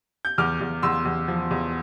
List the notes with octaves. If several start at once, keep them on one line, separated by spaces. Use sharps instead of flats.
G6
E2 D6 F6
E2
E2 C6 E6
E2
F3
E2